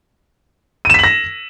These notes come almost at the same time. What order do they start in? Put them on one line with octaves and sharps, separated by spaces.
D#7 E7 B6 F#7 A#6